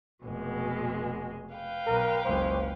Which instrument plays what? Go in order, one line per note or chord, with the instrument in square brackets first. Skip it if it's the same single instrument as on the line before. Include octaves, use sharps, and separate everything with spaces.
[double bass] F1 [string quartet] B2 G#3
[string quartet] B4 F5 G5
[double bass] B1 [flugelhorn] A#4
[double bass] F#1 C#2 [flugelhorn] C5